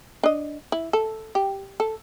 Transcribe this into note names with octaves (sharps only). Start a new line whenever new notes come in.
D4 D#5
E4
A4
G4
A4